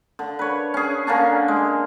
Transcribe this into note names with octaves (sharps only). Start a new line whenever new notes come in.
D3
B4 C#5
C#4 G#4
D3 A#3 C#4 D4
G#3